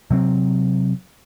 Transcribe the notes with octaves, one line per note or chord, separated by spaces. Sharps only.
C3 F#3 C4